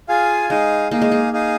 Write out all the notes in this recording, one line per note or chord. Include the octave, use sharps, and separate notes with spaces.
F4 G#4 F5 G#5
G#3 D#4 G#4 F5
A#3 D#4 G#4 F5
G#3
A#3
D#4 G#4 F5